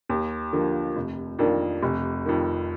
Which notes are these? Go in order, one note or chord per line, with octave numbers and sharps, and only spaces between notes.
D#2
D3 F3 A#3
F1
F2 D#3 A#3 D4
F1
F2 D#3